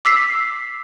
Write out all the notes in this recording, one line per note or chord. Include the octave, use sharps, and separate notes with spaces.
D6 E6 B6 C7